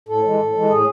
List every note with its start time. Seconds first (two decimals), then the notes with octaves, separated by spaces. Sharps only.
0.09 A2 A4
0.24 E3 G#3
0.39 A2
0.55 E3 G#3
0.70 A2 G#4